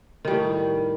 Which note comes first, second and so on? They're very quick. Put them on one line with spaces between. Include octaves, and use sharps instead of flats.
D#3 G3 A2